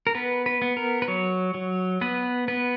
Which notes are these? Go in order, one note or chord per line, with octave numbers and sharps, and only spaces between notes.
A#4
B3 B4
B4
B3
A#4
B4
F#3 C#5
F#3
B3 B4
B3 B4